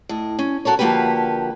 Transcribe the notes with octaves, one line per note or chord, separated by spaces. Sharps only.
A2 D#5
C#4
F#4 A4 A#4 C#5
D3 F3 A#3 F#4 G4 B4